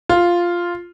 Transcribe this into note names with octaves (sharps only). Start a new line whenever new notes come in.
F4